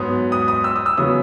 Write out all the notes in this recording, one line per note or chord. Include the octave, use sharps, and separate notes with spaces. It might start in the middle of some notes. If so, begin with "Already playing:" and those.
Already playing: G#2 F#3 B3 D#6
D#6
D#6
E6
D#6
E6
C#3 F#3 B3 D#6